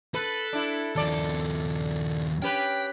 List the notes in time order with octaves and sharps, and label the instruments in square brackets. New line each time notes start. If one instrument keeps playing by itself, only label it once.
[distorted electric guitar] A4 [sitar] B4
[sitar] D4 E4
[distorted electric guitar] D#2 F3 [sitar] A4 D5
[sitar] C#4 G4 B4 [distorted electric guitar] G5